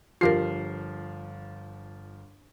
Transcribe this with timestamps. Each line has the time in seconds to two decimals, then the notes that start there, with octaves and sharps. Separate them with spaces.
0.21 G1 F3 F4 G4 A#4 C7